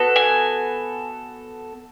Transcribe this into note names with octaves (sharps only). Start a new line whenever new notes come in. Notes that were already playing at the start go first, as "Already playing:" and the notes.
Already playing: B3 F#4 A4
G#5